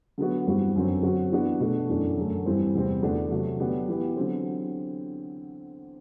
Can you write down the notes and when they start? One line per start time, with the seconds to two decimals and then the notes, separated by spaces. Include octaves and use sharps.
0.18 D3 F#3 B3 F#4
0.47 G2 E3 G3 C4 F#4
0.76 F#2 D3 F#3 C4
1.03 D3 F#3 C4 F#4
1.32 E3 B3 D4 F#4
1.60 B2 A3 D4 F#4
1.89 F#2 E3 A3 D4
2.17 F#2 D3 A3
2.46 G2 E3 G3 C4
2.75 E2 C3 G3 C4
3.02 E2 D3 A3 D4 F#4
3.31 C3 F#3 A3
3.60 D3 F#3 B3 D4 G4
3.88 E3 B3 E4 G4
4.16 D3 F#3 C4